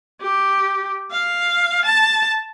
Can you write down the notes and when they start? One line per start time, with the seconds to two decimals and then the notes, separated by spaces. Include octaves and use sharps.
0.21 G4
1.11 F5
1.85 A5